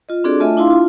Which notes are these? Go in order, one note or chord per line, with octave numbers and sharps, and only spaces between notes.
F4 D#5
C4 D4 F#4 G#4 A4 D5
A3 F4 D#5 E5 G#5 A5
D4 E4 F4 F5 C6
F4